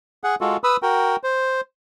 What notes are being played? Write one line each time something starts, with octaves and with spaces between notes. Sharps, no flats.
G#4 F#5
G#3 F4 F#4 A4
B4 B5 D#6 E6
F#4 A#4 G5
C5